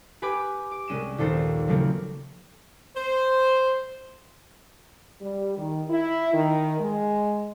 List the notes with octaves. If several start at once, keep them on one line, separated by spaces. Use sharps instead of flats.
G4 B4 G#5 B5 D6 G#6
D6
C2 G#3 C#4 D#7 E7
A#1 D#2 A4 C5
C#3 F3 F#3 A3 A#3 C4
C5
G3
D#3
E4
D#3
G#3